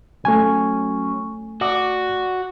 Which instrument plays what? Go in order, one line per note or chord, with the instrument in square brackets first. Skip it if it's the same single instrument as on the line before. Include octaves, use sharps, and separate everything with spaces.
[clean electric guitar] F#3 C#4 [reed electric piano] A3 G#5
[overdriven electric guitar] F#4 [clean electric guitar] D5